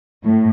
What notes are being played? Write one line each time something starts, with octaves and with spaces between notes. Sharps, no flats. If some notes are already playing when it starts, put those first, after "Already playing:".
A2